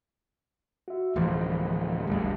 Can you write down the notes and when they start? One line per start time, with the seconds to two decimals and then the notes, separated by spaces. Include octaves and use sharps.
0.88 F#4 E5
1.16 D1 D2 E3 F3
2.07 G#1 D2 G3